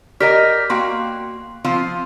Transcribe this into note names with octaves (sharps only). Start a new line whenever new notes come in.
G4 A#4 D5 D#5 F6 B6
A#3 F#4 G5 C6
F3 C4 F4